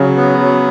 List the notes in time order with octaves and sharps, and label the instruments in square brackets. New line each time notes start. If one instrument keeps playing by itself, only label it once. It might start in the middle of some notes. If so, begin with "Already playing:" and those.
Already playing: [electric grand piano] C#3 [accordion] F#3
[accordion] B3
F#3